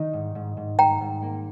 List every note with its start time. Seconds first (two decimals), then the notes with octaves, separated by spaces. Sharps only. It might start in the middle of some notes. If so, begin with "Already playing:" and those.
Already playing: D#3 D#4
0.13 G#2
0.35 G#2
0.57 G#2
0.79 G#2 G5 A#5
1.01 G#2
1.22 A#3